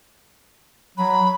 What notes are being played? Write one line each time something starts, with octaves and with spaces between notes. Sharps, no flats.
F#3 B5